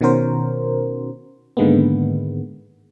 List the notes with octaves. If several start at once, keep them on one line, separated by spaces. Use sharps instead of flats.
B2 D#3 C#4 F#4 A#4 C5
G#2 D3 D#3 G#3 A#3 B3